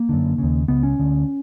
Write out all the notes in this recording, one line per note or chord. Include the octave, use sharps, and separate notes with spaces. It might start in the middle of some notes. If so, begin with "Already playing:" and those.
Already playing: A#3
F#2 D3
D#2 C#3
C#2 C#3 B3
C#4
D2 D3